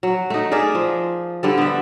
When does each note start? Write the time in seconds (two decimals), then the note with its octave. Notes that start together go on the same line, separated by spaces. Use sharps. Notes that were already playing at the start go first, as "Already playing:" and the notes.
0.03 F#3
0.30 A3 D#4
0.52 G#4 A#4 D5 E5
0.75 F3
1.43 D3 G3 A4
1.58 B3 E5